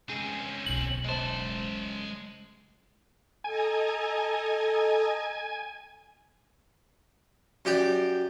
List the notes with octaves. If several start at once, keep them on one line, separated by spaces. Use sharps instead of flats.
C#2 C4 C#4 G#4
D1 B1 F#7
C#2 F#2 G#3 C5 A5
A4 D#5 G#5 A#5
F#2 G4 D5 G5